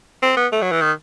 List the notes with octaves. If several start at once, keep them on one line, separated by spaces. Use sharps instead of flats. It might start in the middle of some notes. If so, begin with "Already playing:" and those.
C4
B3
A3
F#3
E3
D#3